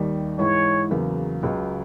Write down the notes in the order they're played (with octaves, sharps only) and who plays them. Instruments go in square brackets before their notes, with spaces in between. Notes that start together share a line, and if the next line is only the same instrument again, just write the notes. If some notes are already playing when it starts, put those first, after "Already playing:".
Already playing: [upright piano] D#2 D#3 G3
[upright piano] G#2 E3 G#3 [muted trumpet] C#5
[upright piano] E2 C#3 F#3 A#3
C#2 C#3 F#3